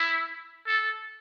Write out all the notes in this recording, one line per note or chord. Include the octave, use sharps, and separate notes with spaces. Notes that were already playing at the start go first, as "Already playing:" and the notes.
Already playing: E4
A4